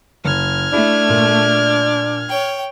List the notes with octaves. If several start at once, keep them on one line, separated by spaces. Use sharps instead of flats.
F#1 F6 G#6
A3 D4 E4
A#2
C#5 G5